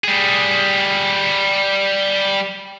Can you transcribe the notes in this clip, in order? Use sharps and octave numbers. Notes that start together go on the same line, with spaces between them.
G3 G#4